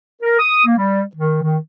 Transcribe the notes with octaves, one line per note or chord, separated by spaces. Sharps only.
A#4
D#6
A#3
G3
D#3
D#3